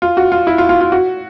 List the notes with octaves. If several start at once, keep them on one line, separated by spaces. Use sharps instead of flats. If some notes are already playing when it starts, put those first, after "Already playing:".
F4
F#4
F4
E4
F4
F4
F4
F#4